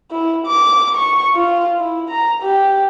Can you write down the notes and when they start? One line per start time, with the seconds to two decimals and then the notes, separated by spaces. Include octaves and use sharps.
0.11 E4
0.46 D6
0.95 C#6
1.35 F4
1.78 E4
2.11 A#5
2.42 G4